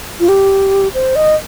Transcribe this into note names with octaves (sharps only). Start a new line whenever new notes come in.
F4
G4
C5
D#5